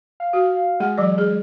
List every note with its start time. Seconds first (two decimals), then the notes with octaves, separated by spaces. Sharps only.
0.20 F5
0.33 F#4
0.80 G#3 G#4 F#5
0.97 E3 F#3 D5
1.18 G#4